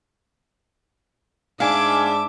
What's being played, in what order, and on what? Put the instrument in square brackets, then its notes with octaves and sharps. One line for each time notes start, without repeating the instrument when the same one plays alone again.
[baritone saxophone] G#2 [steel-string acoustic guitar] D4 [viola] E5 D6 [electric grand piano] F5 G#5